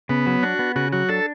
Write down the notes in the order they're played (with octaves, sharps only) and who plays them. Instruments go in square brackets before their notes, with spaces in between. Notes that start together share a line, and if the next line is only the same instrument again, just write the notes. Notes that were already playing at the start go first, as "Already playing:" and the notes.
[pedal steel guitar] C#3 [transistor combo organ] B3
[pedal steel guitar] F#3
[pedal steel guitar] D4 [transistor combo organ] F#4
[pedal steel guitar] B3
[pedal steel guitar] C#3 [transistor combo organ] F#4
[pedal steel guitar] F#3 [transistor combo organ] F#4
[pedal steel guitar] D4 [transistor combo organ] A4